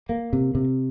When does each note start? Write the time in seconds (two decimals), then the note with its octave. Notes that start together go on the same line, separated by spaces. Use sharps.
0.09 A#3
0.33 C3
0.55 C3